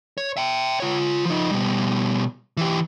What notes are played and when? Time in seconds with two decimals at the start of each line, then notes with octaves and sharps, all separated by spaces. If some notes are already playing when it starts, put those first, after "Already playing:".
0.18 C#5
0.37 E5 G5
0.80 F4 C#5
1.26 F3 D#4
1.51 B2 G3
2.57 E3 G4